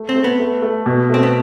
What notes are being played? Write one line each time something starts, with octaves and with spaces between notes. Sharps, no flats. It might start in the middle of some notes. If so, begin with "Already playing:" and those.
Already playing: A3
C4
A3
B3
A3
A3
B2
A3 C4
B3